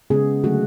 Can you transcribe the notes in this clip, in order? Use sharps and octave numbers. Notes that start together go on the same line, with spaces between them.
C#3 G#3 B3 G#4
D3 F#3 A3 F#4